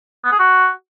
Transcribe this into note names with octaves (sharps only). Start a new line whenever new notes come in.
B3
G#4
F#4